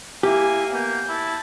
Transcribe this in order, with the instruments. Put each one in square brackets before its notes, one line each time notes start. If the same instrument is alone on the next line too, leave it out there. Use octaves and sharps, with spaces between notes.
[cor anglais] A#3 [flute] E4 [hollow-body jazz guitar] G4 [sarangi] G#5
[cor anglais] A#3 [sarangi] B3 [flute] G6
[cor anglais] E4 [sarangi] A5